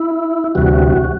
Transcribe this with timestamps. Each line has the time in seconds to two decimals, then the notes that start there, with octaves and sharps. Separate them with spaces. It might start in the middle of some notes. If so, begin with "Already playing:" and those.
Already playing: E4
0.55 D2 C3 E3 G3 F#4